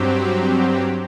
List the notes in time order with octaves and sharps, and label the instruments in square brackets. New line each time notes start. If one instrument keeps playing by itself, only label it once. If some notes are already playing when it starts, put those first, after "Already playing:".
Already playing: [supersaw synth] G2 F#3 C4 G4